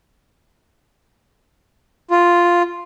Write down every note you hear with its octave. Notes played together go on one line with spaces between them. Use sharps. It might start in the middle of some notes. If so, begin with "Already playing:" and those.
F4